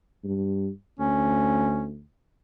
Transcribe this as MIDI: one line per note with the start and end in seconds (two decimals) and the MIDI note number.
0.24 0.70 43
0.99 2.02 38
0.99 1.89 61